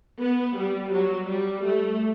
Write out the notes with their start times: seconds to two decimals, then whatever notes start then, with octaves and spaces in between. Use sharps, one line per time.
0.20 B3
0.57 G3
0.93 F#3
1.29 G3
1.66 A3